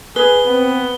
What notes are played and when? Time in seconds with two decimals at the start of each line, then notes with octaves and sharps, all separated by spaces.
0.16 G#4 B4 G7
0.46 B3 C4